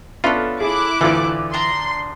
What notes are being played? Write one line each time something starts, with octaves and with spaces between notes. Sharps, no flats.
B3 C#4 D4 F4 A4 E5
E4 G#4 D6 F#6
D2 A2 E3 F4 A4 D5
D4 A#5 C6